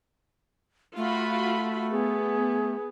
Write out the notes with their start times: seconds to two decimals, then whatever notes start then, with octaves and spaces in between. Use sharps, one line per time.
0.97 A3 F4 F#4 B5
1.91 B3 G#4